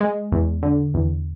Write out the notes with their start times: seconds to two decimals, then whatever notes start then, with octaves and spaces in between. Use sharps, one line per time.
0.01 G#3
0.32 E2
0.63 D3
0.94 E2